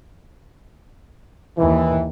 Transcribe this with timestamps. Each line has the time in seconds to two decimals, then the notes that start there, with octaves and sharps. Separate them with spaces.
1.58 D#2 E3